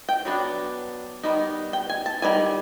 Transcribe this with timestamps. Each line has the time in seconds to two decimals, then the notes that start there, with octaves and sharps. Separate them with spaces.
0.09 G5
0.25 F#3 B3 D4
1.23 D#3 G3 B3 D#4
1.73 G5
1.90 G#5
2.06 A5
2.22 D#3 G3 G#5